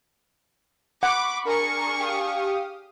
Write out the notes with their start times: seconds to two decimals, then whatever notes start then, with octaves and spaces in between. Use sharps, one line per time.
1.03 F#5 B5 C#6 D6
1.45 D4 G#4 A#4 C#6
1.99 G4 F5 D#6